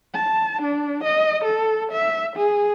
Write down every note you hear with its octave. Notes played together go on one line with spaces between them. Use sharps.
A5
D4
D#5
A4
E5
G#4